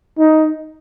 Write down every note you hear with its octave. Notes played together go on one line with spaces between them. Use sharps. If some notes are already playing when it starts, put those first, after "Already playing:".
D#4